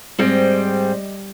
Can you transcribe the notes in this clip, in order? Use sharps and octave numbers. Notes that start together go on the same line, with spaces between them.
G#2 G3 C4 D#5